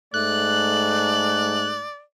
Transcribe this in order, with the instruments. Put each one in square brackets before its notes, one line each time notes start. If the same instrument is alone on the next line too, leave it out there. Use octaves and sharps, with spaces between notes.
[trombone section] G#2 A3 [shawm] D5 [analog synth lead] F#6